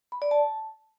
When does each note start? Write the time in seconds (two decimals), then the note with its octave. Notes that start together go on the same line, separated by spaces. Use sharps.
0.12 B5
0.22 D5
0.31 A5